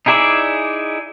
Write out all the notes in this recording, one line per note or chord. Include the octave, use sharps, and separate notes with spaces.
D#4 E4 G#4 D5 E5